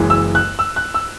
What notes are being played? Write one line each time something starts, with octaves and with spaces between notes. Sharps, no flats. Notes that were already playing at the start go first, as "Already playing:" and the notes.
Already playing: F#1 F#2 E3 G#3
E6
F#6
E6
F#6
E6